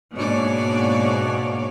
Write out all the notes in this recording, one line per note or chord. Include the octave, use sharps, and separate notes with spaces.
G#2 B2 A#3 D4 C#5 D5